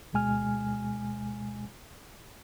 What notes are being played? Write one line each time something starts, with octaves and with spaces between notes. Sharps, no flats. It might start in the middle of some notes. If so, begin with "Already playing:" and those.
D2 B2 G#3 G#5 F6